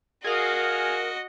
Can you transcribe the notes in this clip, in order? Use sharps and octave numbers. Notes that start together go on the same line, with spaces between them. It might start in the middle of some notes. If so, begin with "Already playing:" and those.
F#4 G#4 A#4 D#5 F5